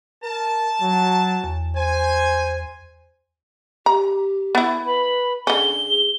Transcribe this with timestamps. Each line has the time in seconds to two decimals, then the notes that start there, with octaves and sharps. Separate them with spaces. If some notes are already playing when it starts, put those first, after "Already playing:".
0.23 A#4 A5
0.81 F#3
1.44 E2
1.76 C5 G#5
3.86 G4 A#5
4.55 B3 E4
4.86 B4 B5
5.47 D3 C#4 G#4 G7